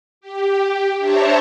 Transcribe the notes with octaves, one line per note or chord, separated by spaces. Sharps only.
G4
D4 C5 C#5 E5 A5 A#5